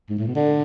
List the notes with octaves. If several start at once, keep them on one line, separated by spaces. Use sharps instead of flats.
G#2
A2
B2
D3